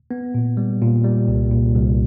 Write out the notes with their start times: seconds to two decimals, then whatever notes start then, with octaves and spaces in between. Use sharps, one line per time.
0.11 B3
0.35 A#2
0.57 G3
0.81 A#2
1.04 G3
1.28 C2
1.52 A#2
1.75 C2